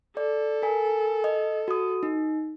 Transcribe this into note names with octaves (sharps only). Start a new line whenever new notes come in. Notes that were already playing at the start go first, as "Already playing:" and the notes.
A4 D5
A#4 G#5
D#5
F#4 D#6
D#4